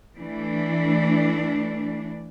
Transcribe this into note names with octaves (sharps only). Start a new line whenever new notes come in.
E3 A3 D4